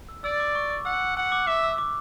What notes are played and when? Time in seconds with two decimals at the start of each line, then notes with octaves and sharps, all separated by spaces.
0.09 E6
0.24 D5 E6
0.40 D6
0.55 C#6
0.70 D6
0.85 F#5 E6
1.17 F#5 F#6
1.32 D6
1.47 E5 D6
1.64 E6
1.78 D6